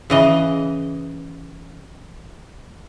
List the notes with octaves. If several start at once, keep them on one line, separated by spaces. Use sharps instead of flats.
C#3 E3 D#5